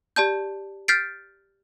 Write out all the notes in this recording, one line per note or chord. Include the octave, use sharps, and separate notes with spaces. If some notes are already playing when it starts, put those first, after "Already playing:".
G4 D5 A5 G6
F6 G6 A6 B6 C7 D7